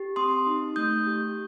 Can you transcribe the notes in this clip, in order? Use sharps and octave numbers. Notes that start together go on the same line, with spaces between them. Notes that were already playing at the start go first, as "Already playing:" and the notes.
Already playing: G4
C4 C6 D#6
D#4
A3 D#6 G6
G4